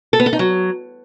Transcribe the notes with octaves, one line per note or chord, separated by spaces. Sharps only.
A4
B3
A4
D#4
F#3